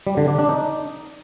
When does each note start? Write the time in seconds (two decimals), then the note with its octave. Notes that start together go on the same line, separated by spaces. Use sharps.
0.07 G3
0.17 D3
0.28 D4
0.39 D4
0.49 D#4